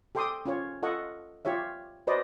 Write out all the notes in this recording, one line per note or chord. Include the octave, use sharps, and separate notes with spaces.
G4 A4 G5 C6 D6 D#6
C#4 F4 C#5
F4 A4 D#5 F#5 C#6
F4 G4 C#5 E5
F#4 B4 C5 D5 D#5